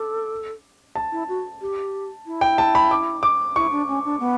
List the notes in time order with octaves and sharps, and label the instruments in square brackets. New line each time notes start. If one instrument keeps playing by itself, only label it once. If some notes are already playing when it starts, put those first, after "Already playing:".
Already playing: [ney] A4 [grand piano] D6
[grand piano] A5
[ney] E4
F#4
G4
E4
[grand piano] G5
A5
B5
D6
D6
[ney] E4 [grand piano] C#6
[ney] D4
C#4
D4
B3